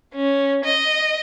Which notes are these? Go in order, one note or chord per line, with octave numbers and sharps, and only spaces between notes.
C#4
D#5